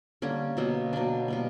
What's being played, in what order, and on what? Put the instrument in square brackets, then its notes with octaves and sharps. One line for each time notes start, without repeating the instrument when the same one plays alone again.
[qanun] D3 G3 A#3 C#4
B2 F#3 A#3
B2 F#3 A#3 D4
B2 G3 A#3